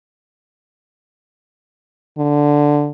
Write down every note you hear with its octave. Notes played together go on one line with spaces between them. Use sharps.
D3